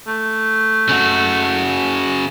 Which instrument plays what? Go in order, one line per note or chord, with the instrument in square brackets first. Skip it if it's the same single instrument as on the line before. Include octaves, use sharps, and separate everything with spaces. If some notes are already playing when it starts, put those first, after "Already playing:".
[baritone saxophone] A3
[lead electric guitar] C#3 F#4